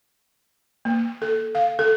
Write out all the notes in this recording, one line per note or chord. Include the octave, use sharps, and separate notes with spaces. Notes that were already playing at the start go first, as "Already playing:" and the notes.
A#3
A4
F5
A4